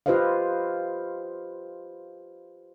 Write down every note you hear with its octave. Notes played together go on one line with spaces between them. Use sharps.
F4 G4 B4 C5 D#5 F5